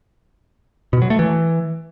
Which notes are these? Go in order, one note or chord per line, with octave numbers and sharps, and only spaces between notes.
B2
F#3
A3
E3